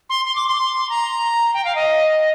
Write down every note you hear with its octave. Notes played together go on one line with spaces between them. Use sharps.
C6
C6
D6
C6
A#5
G5
F5
D#5